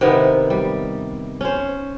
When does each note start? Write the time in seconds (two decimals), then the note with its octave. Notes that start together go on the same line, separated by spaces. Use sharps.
0.01 C3 D#3 B3 E4
0.50 G3
1.41 C#4 C5